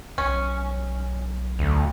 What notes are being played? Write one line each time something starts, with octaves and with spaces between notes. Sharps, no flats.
B1 C#4
D2